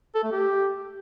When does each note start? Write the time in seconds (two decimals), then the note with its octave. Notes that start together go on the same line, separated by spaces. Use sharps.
0.15 A4
0.23 A3
0.32 G4